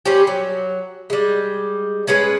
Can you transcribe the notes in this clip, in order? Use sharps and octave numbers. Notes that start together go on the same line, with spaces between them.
G3 C4 C#4 G4
F#3
G3 G#3
G#3 C#4 G#4 B4